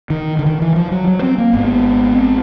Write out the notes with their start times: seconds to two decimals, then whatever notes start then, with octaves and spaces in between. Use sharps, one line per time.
0.10 D#3
0.39 D3
0.46 D#3
0.62 E3
0.76 F3
0.92 F#3
1.07 F#3
1.22 C4
1.38 A#3
1.53 G#1 G#2 B3
2.14 C4